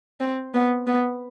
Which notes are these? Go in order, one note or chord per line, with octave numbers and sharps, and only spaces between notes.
C4
B3
B3